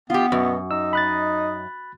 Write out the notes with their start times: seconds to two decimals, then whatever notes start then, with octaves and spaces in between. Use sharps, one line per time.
0.10 B3 F4 G4
0.32 F#2 B2
0.71 D#4 E6
0.93 D#5 B5 F#6 A6